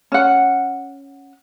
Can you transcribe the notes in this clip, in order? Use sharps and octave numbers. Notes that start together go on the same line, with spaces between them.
C#4 F#5